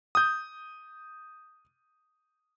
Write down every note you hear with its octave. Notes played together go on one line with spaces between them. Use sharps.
D#6 G6